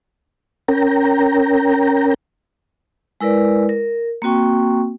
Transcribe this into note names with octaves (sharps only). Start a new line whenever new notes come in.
C#4 A#4 G5 A#5
G#3 E4 A#4 B4 D5
A#4
A#3 C4 F#4 G5 C#6